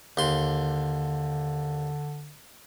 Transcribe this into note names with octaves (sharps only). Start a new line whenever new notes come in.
D#2 D3 C6